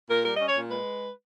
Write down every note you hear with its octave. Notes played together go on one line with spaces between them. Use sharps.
A#2 A#4
G3 A#4
C#4 D#5
C#5
A#2
G#3 B4